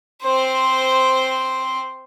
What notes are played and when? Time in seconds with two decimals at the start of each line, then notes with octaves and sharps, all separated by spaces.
0.24 C4 C5